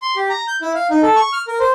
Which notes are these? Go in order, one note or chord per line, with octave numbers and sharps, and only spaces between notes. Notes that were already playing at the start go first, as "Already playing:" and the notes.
C6
G4
A#5
G6
E4
F5
D#4
A4
C#6
F6
A#4
C5